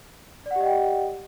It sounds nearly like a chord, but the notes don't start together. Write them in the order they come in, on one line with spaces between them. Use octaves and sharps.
D5 F#5 G4 D#5 G5